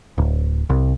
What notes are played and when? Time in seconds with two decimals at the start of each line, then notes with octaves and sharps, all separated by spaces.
0.18 D1
0.69 C2